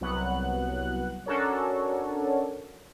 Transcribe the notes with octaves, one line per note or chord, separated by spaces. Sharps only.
C2 F#3 B3 F#5 F#6
C#4 D4 F#4 A4 A#4 C#5